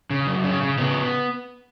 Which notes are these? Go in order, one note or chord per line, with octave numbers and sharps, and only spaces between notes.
C#3
F#2
C#3
C#3
C#3 B3